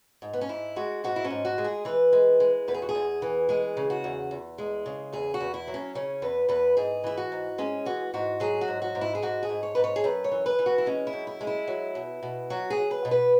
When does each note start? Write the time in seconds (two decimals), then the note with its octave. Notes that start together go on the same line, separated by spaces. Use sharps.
0.22 G#2
0.33 B3
0.41 C#4
0.49 G#2 E4
0.76 G#3 F#4
1.04 G#2 F#4
1.16 E4
1.25 C#4
1.30 G#2
1.45 F#4
1.58 G#3
1.64 G#4
1.85 E3 B4
2.13 G#3
2.40 G#3
2.68 E2 B4
2.74 G#4
2.82 F#4
2.89 G#4
2.95 E2
3.22 E3
3.49 G#3 G#4
3.77 C#3
3.90 F#4
4.04 E2
4.31 E2
4.58 G#3
4.86 C#3
5.13 E2 G#4
5.34 F#4
5.41 E2
5.54 E4
5.67 F#3
5.74 C#4
5.95 C#3 C#4
6.22 E2 B4
6.49 E2 B4
6.77 G#2 G#4
7.04 E3 E4
7.17 F#4
7.32 G#2
7.58 G#3 C#4
7.86 E3 F#4
8.14 G#2 F#4
8.40 F#3 G#4
8.61 F#4
8.68 G#2
8.82 F#4
8.95 G#2
9.01 E4
9.15 G#4
9.22 G#2 F#4
9.43 G#4
9.49 G#2
9.63 C#5
9.75 G#2 B4
9.84 C#5
9.96 G#4
10.04 F#2 B4
10.24 C#5
10.31 E3
10.46 B4
10.59 E3
10.66 F#4
10.78 E4
10.86 G#3 C#4
11.07 E4
11.13 F#2
11.27 E4
11.41 G#3
11.47 E4
11.67 F#3
11.95 B2
12.23 B2
12.50 F#3 F#4
12.70 G#4
12.77 F#3
12.91 B4
13.05 B2
13.11 B4